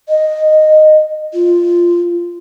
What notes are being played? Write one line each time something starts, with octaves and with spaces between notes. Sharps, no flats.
D#5
F4